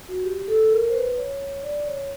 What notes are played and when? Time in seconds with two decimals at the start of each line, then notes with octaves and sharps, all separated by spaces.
0.09 F#4
0.24 G4
0.48 A4
0.71 A#4
0.89 C5
0.94 B4
1.17 C#5
1.63 D5
1.87 C#5